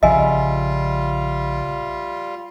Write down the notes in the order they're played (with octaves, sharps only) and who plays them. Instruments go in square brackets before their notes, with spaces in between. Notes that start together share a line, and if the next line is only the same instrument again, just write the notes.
[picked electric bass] A#1 C#3 F3 [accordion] G3 F4 [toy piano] D#5 G#5 [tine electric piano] E5